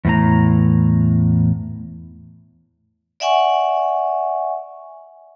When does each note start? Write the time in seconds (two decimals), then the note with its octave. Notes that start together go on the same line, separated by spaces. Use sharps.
0.05 E2 A2 A#5
3.20 D5 E5 F#5 G#5 C#6